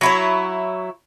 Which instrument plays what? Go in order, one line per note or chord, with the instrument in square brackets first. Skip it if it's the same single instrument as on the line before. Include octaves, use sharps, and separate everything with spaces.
[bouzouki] F#3 E4 C#5